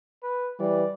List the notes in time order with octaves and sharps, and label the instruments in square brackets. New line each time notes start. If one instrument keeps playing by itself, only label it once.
[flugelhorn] B4
[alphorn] E3 [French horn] G3 [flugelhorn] D5